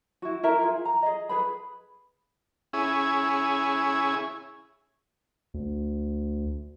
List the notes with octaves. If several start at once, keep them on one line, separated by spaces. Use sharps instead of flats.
E4 F#4
E4 A#4 E5 A#5
F4 G#4
A#5
G#4 D#5
G#4 B4 B5
C#4 E4 G#4
D2